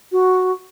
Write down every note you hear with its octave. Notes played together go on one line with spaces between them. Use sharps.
F#4